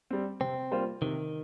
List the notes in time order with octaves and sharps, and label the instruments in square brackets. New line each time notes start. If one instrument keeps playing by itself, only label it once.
[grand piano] G3 C4
[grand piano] C3 [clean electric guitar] C4
[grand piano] G3 A#3 F4 C5
[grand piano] C3 [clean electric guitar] D#3